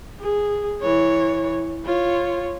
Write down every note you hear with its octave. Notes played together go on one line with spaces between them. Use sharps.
G#4
E3 C#5
F4 C#5